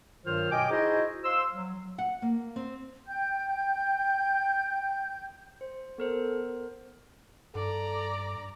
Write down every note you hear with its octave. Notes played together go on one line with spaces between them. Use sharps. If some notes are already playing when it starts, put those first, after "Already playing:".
G2 D#3 F#3 F4 C5 F6
B2 D#5 G5 G#5 D6
D#4 E4 F#4 G#4 C5 D#5
C5 F5 C6 E6
F#3
F#5
A#3
C4
G5 G6
C5
B3 A4 A#4 C5
G2 A4 D5 A#5